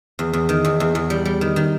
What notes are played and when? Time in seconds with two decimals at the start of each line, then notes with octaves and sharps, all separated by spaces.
0.19 E2
0.33 E2
0.49 D#3
0.65 E2
0.80 E2
0.95 E2
1.10 G3
1.25 G3
1.41 D#3
1.56 D#3